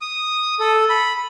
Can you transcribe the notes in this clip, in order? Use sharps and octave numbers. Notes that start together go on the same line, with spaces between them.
D#6
A4
B5